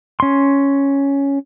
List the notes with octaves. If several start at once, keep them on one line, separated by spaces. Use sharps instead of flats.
C#4 C6